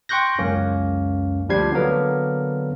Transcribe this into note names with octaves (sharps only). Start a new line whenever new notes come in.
G5 C6 C#6 F#6 G6 A#6
C#2 F#2 A#3 C#4
D2 F3 G3 D4 G#6 C7
D3 F#3 A#3 B3 A#4